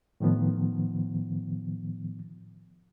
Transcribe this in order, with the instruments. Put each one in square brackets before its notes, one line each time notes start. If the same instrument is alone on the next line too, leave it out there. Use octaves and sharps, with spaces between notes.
[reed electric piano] A2 D#3 F3 B3